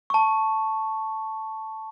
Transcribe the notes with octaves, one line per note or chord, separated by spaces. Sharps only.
A5 C#6